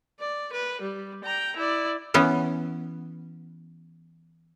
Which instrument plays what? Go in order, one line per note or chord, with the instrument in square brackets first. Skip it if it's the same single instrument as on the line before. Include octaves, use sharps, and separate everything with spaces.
[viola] D5
B4
G3
G5 A#5
E4 D5
[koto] E3 B3 C#4